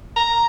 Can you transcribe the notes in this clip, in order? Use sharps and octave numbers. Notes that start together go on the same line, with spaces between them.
A#5